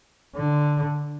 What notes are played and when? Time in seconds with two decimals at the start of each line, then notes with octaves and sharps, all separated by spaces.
0.36 D3